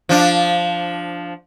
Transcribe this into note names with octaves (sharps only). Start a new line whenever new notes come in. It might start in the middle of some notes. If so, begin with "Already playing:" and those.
F3 D4